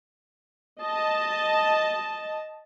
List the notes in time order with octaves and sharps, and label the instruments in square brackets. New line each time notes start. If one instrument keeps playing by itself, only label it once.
[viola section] D#5 A5